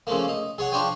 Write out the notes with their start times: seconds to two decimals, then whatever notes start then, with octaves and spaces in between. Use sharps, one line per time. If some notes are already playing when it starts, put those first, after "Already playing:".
0.07 C#3 F3 A3 A#3
0.28 D#4
0.58 G#4 C#5 F#5
0.72 F3 D4 C5 C#5 G5 G#5